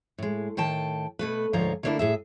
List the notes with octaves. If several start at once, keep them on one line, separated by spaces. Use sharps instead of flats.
A2 G#3
A2 D#3 G5 A5
B2 A3 B4
D2 G#2 F3 F4 C#5 A#5
D3 A3 A#3 C#4 D4 E4
A2 G#4 E5